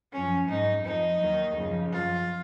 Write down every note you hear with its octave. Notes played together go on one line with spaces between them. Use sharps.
F#2 F3 C#4
G#2 F#3 D#4
F2 F3 D#4
D#2 D#3 F#3
F#2 C#3 F3
F#2 F3 F4